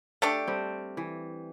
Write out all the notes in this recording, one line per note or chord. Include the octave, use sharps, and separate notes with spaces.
A3 D4 G4
G3 C4
E3